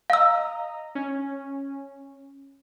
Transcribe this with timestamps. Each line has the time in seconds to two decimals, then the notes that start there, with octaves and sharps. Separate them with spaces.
0.10 D#5 F5 A#5 E6
0.95 C#4